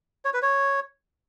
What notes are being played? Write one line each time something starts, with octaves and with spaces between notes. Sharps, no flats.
C#5
B4
C#5